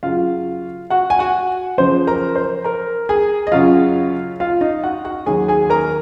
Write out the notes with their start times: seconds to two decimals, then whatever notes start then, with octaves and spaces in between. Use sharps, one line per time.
0.03 F#2 C#3 F#3 F4 F5
0.90 F#4 F#5
1.10 G#5
1.19 F#4 F#5
1.78 F#2 C#3 F3 C5 C6
2.07 A#4 A#5
2.35 C5 C6
2.64 A#4 A#5
3.09 G#4 G#5
3.47 D#5
3.52 F#2 C#3 F#3 F4 F5
4.40 F4 F5
4.61 D#4 D#5
4.84 F#4 F#5
5.05 F#4 F#5
5.26 D#2 D#3 F#3 G#4 G#5
5.48 G#4 G#5
5.70 A#4 A#5